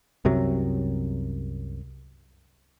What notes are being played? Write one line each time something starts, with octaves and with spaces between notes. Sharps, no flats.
C2 F#2 C3 F#3